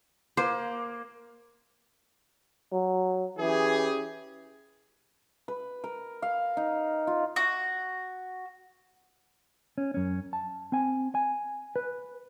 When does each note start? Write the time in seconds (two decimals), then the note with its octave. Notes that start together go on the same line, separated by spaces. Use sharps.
0.37 A#3 C5
2.72 F#3
3.38 E3 C#4 G4 G#4
5.48 B4
5.84 A#4
6.22 F5
6.57 D#4
7.07 F4
7.36 F#4
9.78 C#4
9.94 F#2 C#4
10.33 A5
10.72 C4 G#5
11.15 G#5
11.76 B4